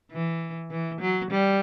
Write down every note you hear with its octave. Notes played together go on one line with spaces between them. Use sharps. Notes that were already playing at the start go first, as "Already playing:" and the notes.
E3
E3
F#3
G3